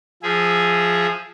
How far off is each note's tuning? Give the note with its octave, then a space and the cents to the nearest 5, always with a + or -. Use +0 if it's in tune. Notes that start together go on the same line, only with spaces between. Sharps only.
F3 +0 G#4 +0 E5 +10